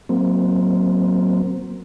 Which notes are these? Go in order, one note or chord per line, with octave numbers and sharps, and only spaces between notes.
F#3 A#3 C4